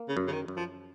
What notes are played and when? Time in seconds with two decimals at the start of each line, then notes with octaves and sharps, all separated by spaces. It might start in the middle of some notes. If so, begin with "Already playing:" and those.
Already playing: A#3
0.09 C#3
0.17 F#2
0.28 C#3
0.32 D#3
0.48 F#2
0.56 F3